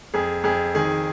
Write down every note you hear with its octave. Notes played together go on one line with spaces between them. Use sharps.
F2 G#4
F2 G#4
D#3 G#4